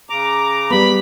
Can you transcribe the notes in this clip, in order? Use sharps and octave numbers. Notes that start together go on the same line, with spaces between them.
C#3 A#5 D6
G3 B3 B5